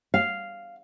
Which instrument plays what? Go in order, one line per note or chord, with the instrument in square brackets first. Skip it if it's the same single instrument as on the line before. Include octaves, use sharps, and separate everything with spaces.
[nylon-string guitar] F5